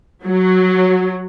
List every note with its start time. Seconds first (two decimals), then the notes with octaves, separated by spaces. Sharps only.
0.24 F#3